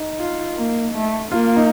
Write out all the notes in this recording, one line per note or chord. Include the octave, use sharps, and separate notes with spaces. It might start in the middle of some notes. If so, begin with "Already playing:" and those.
Already playing: D#4
F4
A#3
A3
A#3 F4
D#4